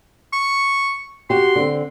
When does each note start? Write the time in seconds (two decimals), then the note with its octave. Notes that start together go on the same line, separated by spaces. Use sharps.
0.33 C#6
1.30 F#4 G4 C6
1.56 D3 C4